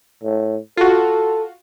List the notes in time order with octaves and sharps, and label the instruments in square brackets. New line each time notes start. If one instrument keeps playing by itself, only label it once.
[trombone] A2
[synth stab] F4 F#4 [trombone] A4